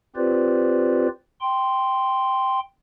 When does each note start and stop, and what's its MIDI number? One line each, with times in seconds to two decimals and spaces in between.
0.16 1.08 60
0.16 1.08 65
0.16 1.08 67
0.16 1.08 71
0.16 1.08 72
0.16 1.08 74
1.41 2.60 79
1.41 2.60 84